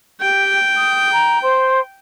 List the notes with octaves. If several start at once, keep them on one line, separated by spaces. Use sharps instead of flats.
G4 G5
D#6
A#5
C5 C6